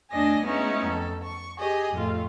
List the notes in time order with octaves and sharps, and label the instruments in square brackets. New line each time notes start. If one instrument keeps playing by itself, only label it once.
[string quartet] E2 A3 D4 D#5 G#5 A#6
G#3 A3 B3 C#4 D#4 E4
F2 A4
C#6
G4 G#4 D#5
F2 A2 A3 F4